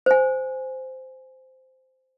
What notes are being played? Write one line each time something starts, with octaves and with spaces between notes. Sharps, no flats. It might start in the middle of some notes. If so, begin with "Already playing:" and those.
C5 G#5